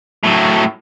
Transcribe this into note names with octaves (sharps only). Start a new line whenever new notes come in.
A2 F#3